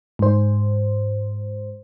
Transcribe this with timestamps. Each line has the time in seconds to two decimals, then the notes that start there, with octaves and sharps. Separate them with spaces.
0.19 G#2 C5